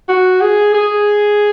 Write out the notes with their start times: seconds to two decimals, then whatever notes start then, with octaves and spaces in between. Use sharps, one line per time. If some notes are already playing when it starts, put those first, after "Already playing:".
0.08 F#4
0.41 G#4
0.74 G#4